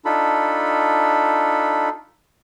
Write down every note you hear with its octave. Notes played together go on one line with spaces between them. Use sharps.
D4 D#4 F4 A4 B5